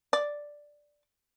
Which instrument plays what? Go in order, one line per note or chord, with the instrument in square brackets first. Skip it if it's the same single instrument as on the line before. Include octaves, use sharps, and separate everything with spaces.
[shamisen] D5